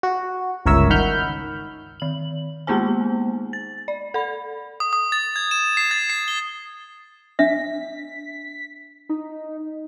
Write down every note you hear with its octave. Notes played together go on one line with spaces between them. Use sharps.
F#4
G1 C#2 A#4 C#5 E5 E6
D#3 F#5 B5 F6 G6
D#3 F#7
G#3 A#3 B3 D#4 C5 G#5
A6
D5
A4 B5
D#6
D#6
A6
G#6
E7
C7
A6
C7
G7
D4 E5 B6
D#4